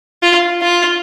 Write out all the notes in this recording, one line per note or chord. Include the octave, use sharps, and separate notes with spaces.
F4
F4